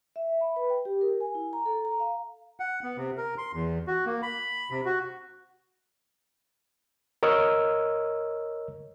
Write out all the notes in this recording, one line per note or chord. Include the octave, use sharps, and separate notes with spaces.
E5
B5
B4
G5
G4
A#4
G#5
E4
A#5
A4
A#5
F5
F#5
B3
C3
A#4
C6
E2
F#4
A#3
B5
C3
F#4
A#4 C#5 D#5 E6 F6